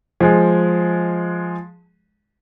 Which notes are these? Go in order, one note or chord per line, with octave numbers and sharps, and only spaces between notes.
F3 G#3